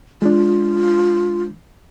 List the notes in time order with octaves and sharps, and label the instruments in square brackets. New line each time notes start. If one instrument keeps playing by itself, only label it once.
[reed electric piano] G#3 D4 [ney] F4